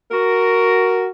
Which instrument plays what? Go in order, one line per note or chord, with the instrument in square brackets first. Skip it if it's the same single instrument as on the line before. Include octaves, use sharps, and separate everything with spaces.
[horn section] F#4 A#4